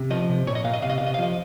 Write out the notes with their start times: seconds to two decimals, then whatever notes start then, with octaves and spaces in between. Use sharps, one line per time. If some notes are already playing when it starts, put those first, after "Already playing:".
Already playing: C3
0.10 F3 D#5
0.29 C3
0.46 A#2 C#5
0.55 D#5
0.64 A#2 F5
0.73 D#5
0.82 C3 F5
0.90 D#5
0.98 F5
1.01 C3
1.06 D#5
1.14 F5
1.18 F3 D#5